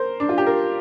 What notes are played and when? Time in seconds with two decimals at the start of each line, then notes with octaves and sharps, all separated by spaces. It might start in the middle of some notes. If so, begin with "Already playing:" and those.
Already playing: A#4 C5
0.20 D4
0.29 F4
0.38 G4
0.47 A#4